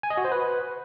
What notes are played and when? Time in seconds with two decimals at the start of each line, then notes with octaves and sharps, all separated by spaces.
0.03 G#5
0.10 D#5
0.17 F#4
0.25 C5
0.32 B4